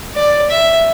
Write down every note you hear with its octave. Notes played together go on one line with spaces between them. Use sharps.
D5
E5